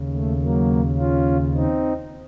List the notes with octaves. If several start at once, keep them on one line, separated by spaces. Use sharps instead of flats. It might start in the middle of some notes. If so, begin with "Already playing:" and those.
Already playing: D#2 C#3
A3
F#3 A#3
C#4 F4
C4 D#4